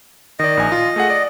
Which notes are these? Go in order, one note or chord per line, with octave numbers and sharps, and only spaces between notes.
D#3 D5 D#5
A#1 G#5
F4
A3 G#4 F#5
D5